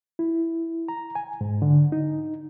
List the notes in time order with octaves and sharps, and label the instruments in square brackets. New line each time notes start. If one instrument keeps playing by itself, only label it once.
[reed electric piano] E4
A#5
G#5
G#2
D3
D#4